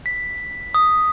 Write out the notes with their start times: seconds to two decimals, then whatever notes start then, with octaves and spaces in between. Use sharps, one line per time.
0.06 B6
0.74 D#6